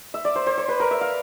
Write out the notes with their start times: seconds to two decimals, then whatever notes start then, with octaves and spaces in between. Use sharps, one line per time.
0.14 E5
0.25 D5
0.36 C5
0.47 C5
0.58 C5
0.68 B4
0.80 A#4
0.91 E5
1.01 F5